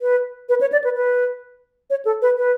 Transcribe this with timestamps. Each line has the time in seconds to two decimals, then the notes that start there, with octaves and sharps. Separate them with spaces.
0.02 B4
0.49 B4
0.61 C#5
0.72 D5
0.84 B4
0.96 B4
1.90 C#5
2.05 A4
2.22 B4
2.37 B4